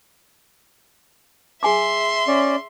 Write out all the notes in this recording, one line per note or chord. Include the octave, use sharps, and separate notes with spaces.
G#4 E5 G#5 C6 D6
C#4 D5